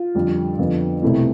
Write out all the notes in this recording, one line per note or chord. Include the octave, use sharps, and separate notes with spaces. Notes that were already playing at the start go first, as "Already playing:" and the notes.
Already playing: F4
F2 D3 G3
F2 D3 F3 B3
C2 B2 A3 C4 E4